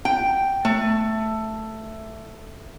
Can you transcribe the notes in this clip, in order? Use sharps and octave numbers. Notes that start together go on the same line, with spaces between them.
G5
A3